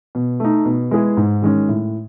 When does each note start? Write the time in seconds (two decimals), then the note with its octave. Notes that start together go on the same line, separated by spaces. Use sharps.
0.15 B2
0.40 A3 D#4
0.65 B2
0.91 G#3 B3 E4 G#4
1.17 G#2
1.42 D#3 G#3 C#4
1.68 A2